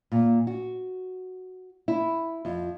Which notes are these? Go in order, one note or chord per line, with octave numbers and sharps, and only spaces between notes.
A#2
F#4
E4
F2